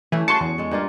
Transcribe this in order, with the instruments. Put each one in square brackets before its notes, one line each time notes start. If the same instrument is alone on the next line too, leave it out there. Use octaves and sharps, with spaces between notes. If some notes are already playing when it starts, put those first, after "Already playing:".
[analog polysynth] E3 [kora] A3 C#4
[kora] F#4 G#4 [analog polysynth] A5 C6 [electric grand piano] C#6 C#7
[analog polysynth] E2
[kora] G#3 A4
G2 A#3 F4